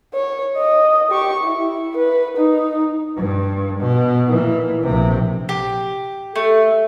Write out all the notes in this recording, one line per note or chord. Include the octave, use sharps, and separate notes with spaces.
C#5
D#5
G4 C#6
E4
B4
D#4
G2
B2
A#2 E3
A#1 C3
G4
A3